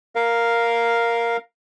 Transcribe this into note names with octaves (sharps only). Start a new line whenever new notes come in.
A#4 F5